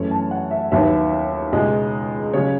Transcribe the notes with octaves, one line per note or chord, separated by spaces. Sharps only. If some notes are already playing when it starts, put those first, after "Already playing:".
Already playing: F#2 E3 A3 C#5
A5
F#5
E5
D#2 D#3 F#3 B3 E5
C#2 B2 G#3 D#5
C#3 F#3 C#5